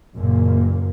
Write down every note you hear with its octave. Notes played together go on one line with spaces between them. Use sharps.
F#1 F#2 A#2 A#3